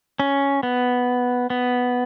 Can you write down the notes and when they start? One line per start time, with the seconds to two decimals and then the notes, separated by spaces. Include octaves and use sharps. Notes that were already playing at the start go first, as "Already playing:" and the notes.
0.20 C#4
0.63 B3
1.50 B3